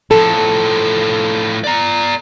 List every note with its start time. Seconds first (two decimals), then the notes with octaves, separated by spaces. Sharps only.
0.11 A2 F3 A4
1.64 D5 A#5